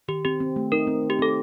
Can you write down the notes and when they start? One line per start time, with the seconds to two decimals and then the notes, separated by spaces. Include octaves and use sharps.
0.08 D#3 G4
0.25 C4 G4
0.40 C4
0.56 A3
0.72 D#4 A#4
0.87 C4
1.03 D#3
1.10 G4
1.19 C4 A4